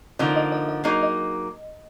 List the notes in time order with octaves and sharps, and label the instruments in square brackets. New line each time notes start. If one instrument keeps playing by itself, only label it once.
[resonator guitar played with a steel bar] D3 F3 A#3 D#4 [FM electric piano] D#5
[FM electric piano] D#5
D#5
D#5
[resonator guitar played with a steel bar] F#3 A#3 D#4 G#4 [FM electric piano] D#5
[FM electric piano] D#5